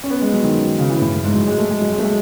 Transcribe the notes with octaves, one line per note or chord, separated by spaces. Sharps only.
C#4
B3
G#3
F#3
D#3
C#3
E3
A2
A2
G#2
F#3
G#3
A3
G#3
F#3
G#3
A3
G#3